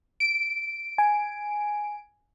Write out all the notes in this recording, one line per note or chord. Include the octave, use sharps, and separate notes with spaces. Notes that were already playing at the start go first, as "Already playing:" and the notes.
D7
G#5